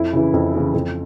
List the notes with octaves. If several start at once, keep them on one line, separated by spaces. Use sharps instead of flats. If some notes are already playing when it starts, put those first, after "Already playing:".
Already playing: F2 E4
C#3 E3
F2
C#3 E3
F2